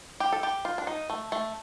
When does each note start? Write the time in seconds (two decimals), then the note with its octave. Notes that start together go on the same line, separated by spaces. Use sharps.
0.20 G4
0.32 A4
0.43 G4
0.65 F4
0.78 D4
0.87 D#4
1.10 A3
1.32 A3